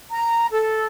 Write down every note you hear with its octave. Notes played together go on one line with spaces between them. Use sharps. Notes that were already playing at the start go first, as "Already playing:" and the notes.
A#5
A4